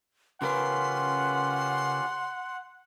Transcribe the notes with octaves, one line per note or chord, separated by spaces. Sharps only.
C#3 C#4 F4 G4 A#4 B4 F#5 C6